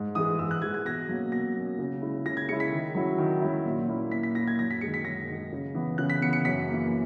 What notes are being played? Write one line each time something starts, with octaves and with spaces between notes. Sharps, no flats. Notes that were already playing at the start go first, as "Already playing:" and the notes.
Already playing: G#2
E3 G#3 D#6
G#2 E6
F#6
E3 G#3 G#6
G#6
B2 A#6
F#3 A#3 C#4
B2 A#6
F#3 A#3 C#4
C#3
G#3 C#4 E4
C#3 A#6
G#6
G#3 C#4 E4 C#7
B6
D#3
F#3 C#4 E4
D#3
F#3 C#4 E4
A#2
A#3 C#4 E4
A#2 B6
B6
A#3 C#4 E4 A#6
G#6
F#2 A#6
B6
D#3 G#3 C#7
B6
F#2 A#6
D#3 G#3
C#3
E3 B3
C#3 F#6
B6
E3 B3 C#7
C#7
F#2 B6
A#3
E3